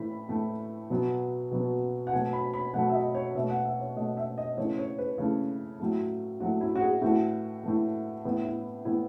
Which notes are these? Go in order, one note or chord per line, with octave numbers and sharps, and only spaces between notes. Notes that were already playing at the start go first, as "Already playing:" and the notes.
Already playing: A2 E3 A3 B5
A2 E3 A3
B2 F#3 B3
B2 F#3 B3
F#5
B2 F#3 A3 G#5
B5
B5
B2 F#3 A3 F#5
E5
D#5
C#5
B2 A3 E5
F#5
E5
C#5
B2 A3 D#5
E5
D#5
C#3 E3 A3 C#5
C#5
B4
C#3 E3 A3
A2 F#3 A3
A2 F#3 A3 F#4
E4
F#4
G#4
A2 E3 A3 F#4
A2 E3 A3
A2 E3 B3
E4
A2 E3 B3 E4